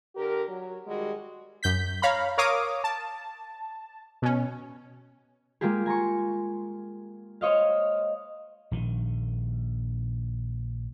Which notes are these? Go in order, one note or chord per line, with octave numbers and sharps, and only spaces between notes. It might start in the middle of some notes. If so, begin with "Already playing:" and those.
D3 G4 A#4
F#3
D#3 G3 G#3 F#4
F#2 G6 B6
C#5 F5 A#5 B5
A#4 C#5 F5 D6 D#6
A5
B2 C#4
G#3 A#3 F4 G4 G#4
G#5 A#5 C6 C#6
C5 C#5 D#5 F5
A#1 D#3